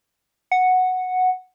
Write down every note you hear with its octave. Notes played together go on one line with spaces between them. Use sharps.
F#5